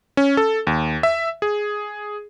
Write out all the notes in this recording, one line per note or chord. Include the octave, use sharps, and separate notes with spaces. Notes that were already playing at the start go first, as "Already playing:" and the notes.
C#4
A4
D#2
E5
G#4